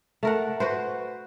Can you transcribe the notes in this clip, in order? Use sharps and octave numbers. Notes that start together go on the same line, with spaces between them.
A3 A#4 F#5
F#4 B4 C5